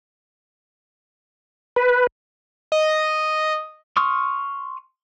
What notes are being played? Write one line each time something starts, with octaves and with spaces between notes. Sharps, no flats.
B4
D#5
C6 C#6 D#6 F6